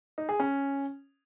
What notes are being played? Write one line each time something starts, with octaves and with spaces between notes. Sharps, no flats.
D#4
G#4
C#4